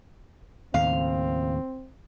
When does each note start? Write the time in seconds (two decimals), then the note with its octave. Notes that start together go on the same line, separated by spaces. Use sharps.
0.74 D#2 A2 C#3 C4 F5